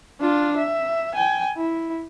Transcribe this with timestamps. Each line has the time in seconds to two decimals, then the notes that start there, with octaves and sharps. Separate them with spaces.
0.20 D4 F4
0.57 E5
1.15 G5 G#5
1.57 E4